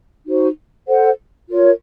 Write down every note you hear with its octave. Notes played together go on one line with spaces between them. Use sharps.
D#4 F#4 C5
A4 C5 F#5
F4 A#4 C#5